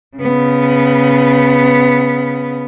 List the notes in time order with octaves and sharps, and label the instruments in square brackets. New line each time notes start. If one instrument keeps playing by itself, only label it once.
[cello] C#3 B3